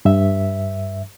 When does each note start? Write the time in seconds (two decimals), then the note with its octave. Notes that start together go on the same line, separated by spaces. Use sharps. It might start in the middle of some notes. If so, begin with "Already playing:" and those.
0.05 G2 E5